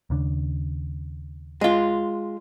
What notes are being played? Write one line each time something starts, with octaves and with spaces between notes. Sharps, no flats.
D#2 C#3 D4
G#3 F4